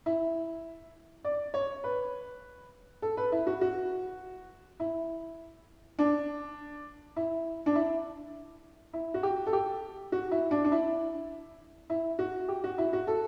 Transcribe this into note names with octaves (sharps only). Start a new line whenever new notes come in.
E4
D5
C#5
B4
A4
B4
E4
F#4
F#4
E4
D4
E4
D4
E4
E4
F#4
G4
A4
G4
F#4
E4
D4
D4
E4
E4
F#4
G4
F#4
E4
F#4
A4